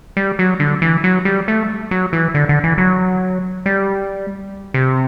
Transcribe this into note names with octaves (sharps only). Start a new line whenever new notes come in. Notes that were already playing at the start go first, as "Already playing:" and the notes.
G3
F#3
D3
E3
F#3
G3
A3
F#3
E3
D3
D3
E3
F#3
G3
C3